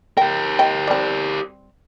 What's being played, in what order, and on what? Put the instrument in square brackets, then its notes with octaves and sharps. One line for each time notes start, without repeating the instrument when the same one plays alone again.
[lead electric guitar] G4 A#4 [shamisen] G5
[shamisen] D#5 G5
G3 C4